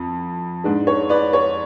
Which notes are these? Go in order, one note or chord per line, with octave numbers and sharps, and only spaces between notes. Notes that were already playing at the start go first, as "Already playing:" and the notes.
Already playing: F2
G#2 G#3 D4
C#5
B4 D5
C#5